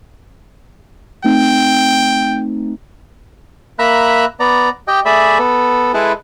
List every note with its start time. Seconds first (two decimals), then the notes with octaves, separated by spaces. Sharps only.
1.24 A3 C4 D#4 G5
3.79 A#3 E5 A#5 B5 F#6
4.40 B3 D5 A#5
4.88 G4 D#5 G5
5.06 A3 G#4 D5 E5 B5
5.39 B3 A4
5.94 G#3 E4 G#4 A4 B4